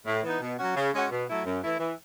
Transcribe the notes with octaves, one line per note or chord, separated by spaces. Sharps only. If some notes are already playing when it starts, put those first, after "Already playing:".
A2
E3 B3 D#4
B2
F#3 C#4 F#4
C#3
G#3 C#4 F#4
B2
F#3 A3 E4
F#2
E3 A3 E4
E3